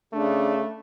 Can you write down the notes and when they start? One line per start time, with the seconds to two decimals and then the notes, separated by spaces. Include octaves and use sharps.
0.13 C#3 A3 D4